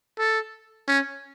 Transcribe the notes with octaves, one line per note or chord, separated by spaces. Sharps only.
A4
C#4